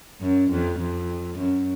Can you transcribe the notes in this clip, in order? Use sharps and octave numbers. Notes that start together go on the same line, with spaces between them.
F#2
F2
F2
F#2